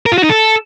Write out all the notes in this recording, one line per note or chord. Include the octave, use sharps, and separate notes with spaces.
A#4
F4
F#4
D#4
A4